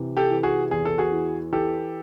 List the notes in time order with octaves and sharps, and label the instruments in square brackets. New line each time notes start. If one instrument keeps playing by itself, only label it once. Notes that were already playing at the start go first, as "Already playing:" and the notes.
Already playing: [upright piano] C3 E3
[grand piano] G4 A4
[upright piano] E3
[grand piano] F#4 G#4
[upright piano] E2 [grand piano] G#4
[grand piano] A4
F#4 G#4
[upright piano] E3
[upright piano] E3 [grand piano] G4 A4